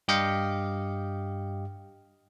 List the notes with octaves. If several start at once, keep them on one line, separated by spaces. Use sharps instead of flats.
G2 G4 D#5 F5 G5 C#7